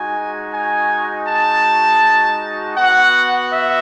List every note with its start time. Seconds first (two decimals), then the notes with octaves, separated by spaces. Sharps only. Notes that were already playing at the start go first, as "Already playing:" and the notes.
Already playing: G#3 D#4 F#4 G#5
0.52 G#5
1.26 A5
2.76 B3 F#4 F#5
3.51 E5